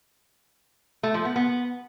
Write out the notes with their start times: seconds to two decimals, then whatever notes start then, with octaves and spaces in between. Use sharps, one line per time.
1.03 A3
1.14 F3
1.25 B3
1.36 B3